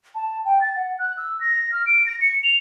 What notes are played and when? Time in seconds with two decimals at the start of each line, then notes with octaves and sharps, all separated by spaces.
0.15 A5
0.45 G5
0.61 A6
0.76 F#5
0.99 F#6
1.17 E6
1.41 A#6
1.72 F6
1.86 D7
2.06 A#6
2.21 C#7
2.43 F7